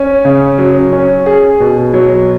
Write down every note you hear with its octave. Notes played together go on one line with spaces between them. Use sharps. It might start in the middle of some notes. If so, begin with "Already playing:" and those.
Already playing: C#4
C#3
F#3
C#4
G#4
B2
F#3